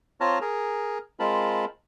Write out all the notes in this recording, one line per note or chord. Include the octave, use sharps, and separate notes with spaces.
C4 F4 C#5 A5 A#5 F6
G#4 A#4
G#3 C4 F4 A#4 A5 B5